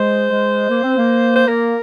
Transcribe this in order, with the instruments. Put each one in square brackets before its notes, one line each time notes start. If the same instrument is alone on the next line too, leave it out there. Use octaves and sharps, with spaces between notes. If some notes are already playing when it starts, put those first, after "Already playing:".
Already playing: [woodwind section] G#3 [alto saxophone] C5
[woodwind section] G#3
A#3
C4
A#3
[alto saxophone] C5
[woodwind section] A#3 [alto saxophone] A#4